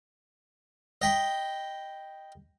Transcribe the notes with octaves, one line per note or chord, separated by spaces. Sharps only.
D#5 G5 B5